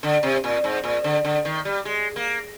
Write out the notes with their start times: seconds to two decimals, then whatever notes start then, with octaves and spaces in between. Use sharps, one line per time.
0.03 D3
0.23 C3
0.44 A#2
0.64 G#2
0.84 A#2
1.04 D3
1.25 D3
1.45 D#3
1.65 G3
1.85 G#3
2.16 A#3